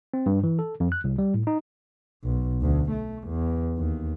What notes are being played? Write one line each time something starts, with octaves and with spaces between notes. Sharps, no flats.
C4
G2
E3
A4
F2
F#6
C2
G3
A2
D#4
B1
D2
A3
E2
D#2